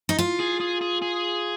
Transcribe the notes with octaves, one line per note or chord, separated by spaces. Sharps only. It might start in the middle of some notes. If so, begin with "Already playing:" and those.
D#4
F4
G#4
G#4
G#4
G#4